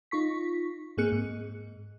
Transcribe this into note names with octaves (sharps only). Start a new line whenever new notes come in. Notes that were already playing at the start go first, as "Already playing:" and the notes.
D#4 F4 C#6 B6
G#2 A#3 C4 G#4 F#6 C#7
G#2